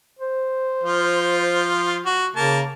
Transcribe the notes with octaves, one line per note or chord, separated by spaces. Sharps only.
C5
F3 F4
F#4
C#3 A#3 A5